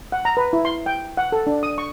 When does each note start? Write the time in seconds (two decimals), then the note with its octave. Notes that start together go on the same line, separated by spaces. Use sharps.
0.12 F#5
0.25 A#5
0.37 B4
0.53 E4
0.65 C6
0.86 G5
1.17 F#5
1.32 A4
1.47 D4
1.63 D#6
1.78 C#6